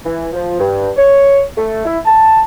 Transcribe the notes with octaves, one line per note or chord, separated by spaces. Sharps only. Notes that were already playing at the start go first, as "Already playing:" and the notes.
E3
F3
G2
C#5
A3
E4
A5